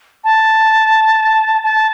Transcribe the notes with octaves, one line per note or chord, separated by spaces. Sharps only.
A5
A5